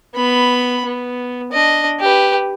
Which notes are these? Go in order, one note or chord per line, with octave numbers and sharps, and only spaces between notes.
B3 B5
B3
D4 D#5
G4 B4